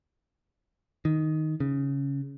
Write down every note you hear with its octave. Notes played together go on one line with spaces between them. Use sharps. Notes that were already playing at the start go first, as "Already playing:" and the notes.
D#3
C#3